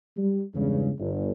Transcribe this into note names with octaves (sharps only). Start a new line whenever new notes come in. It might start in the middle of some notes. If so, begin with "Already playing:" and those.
G3
E2 G2 C#3 G#3
G1